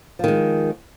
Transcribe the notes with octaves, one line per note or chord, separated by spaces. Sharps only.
D#3 F3 G#3